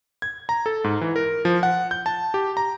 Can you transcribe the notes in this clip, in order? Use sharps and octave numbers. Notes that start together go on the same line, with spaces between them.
G#6
A#5
A4
G#2
E3
A#4
F3
F#5
G6
A5
G4
A#5